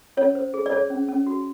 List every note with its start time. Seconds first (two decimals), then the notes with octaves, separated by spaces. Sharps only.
0.17 C#4 C#5
0.35 C5
0.54 G#4
0.66 D5
0.72 G#4 C#5
0.90 C#4
1.08 C#4
1.27 F#4